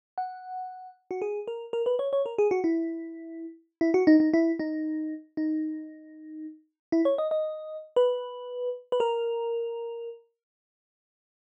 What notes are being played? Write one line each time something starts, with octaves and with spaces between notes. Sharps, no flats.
F#5
F#4
G#4
A#4
A#4
B4
C#5
C#5
A#4
G#4
F#4
E4
E4
F#4
D#4
D#4
E4
D#4
D#4
E4
C#5
D#5
D#5
B4
B4
A#4